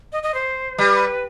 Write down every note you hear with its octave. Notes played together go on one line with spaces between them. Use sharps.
D#5
D#5
C5
G3 B4